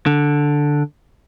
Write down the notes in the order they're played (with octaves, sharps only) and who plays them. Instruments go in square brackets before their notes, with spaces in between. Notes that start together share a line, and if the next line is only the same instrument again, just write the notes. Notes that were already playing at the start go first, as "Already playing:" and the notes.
[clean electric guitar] D3